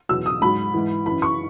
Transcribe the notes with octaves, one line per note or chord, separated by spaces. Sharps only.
E2 B2 F#3 E6
D#6
G#2 F#3 B5
G#2 E3
F#2 E3 B5
C#6